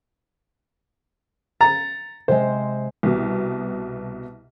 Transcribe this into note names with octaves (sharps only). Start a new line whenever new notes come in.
A#5 A6 C#7
C3 G#3 C5
C2 B2